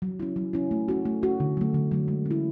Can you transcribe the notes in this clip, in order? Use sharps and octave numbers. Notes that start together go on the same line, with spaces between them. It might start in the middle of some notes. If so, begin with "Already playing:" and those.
F#3
C#4 E4
F#3
C#4 E4
A3
C#4 F#4
A3
C#4 F#4
D3
F#3 A3
D3
F#3 A3
G#3
C#4
E4